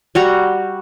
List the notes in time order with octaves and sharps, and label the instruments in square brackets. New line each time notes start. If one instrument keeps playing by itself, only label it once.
[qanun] G3 F#4 A#5